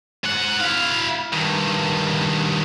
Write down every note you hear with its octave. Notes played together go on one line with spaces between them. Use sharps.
G#2 F#5
E4 F5
G2 D#3